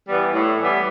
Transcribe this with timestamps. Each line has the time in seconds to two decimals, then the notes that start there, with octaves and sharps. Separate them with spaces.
0.08 E3 G3 B3
0.34 A2
0.58 E3 G3 B3